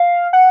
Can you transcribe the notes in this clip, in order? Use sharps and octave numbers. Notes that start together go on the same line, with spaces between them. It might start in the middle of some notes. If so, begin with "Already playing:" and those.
Already playing: F5
F#5